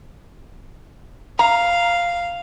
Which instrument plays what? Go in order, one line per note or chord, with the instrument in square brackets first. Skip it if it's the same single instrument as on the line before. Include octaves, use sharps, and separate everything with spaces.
[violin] F5 [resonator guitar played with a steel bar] A#5